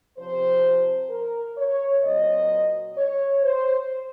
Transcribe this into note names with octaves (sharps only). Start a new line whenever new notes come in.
C3 F3 C4 C5
A#4
C#5
A#2 F#3 C4 D#5
C#5
C5